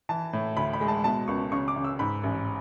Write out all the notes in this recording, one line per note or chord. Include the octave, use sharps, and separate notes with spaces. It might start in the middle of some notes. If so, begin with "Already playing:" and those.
E3 A5
A2
D2 B5
B5
G#3
A5
B2 A5
C#2 C#6
C#3 C#6
D6
C#3
E6
G#2 B5
A1